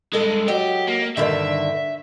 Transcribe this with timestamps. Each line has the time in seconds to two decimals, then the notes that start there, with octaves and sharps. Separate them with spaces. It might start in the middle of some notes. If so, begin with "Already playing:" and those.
0.13 G2 G#3 A4 D#5
0.48 F#3 G4 D#5
0.88 A#3
1.17 G2 D3 D#3 E5